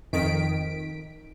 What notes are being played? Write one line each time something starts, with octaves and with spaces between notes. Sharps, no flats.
F2 D#3 B6 D7